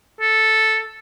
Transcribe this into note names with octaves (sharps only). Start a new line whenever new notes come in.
A4